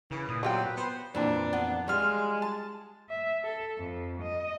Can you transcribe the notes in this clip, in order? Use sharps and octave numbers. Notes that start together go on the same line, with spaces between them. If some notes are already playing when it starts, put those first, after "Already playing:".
C#3 E3
A#2 D#6
F#3 G3 C4 F4 G5
B4
B3 C5
F2 A#2 E3 D4
B3
G3 G#3 F4 F6
A5
E5
A4
F2
D#5